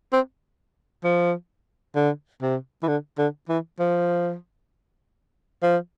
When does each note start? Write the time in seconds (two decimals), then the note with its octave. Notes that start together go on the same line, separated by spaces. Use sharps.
0.13 C4
1.05 F3
1.96 D3
2.42 C3
2.83 E3
2.88 D3
3.18 D3
3.49 E3
3.79 F3
5.63 F3